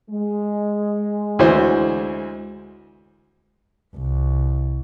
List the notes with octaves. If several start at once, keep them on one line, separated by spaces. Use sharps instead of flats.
G#3
D2 E3 C5
C2